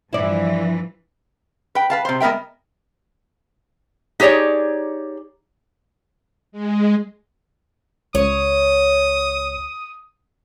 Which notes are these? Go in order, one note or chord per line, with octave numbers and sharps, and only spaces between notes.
G2 E3 F3 E4 D5
B4 G5
B4 F5 A5
C3 C5
G#3 B3 A#4 E5 G5
D#4 G4 G#4 C#5 D5
G#3
C#2 C#5 D#6